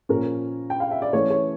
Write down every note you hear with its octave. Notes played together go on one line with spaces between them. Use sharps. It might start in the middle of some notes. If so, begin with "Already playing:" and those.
A#2 F3 C#4 A#4
G5
F5
E5
D5
E3 A3 C#4 C#5
C#5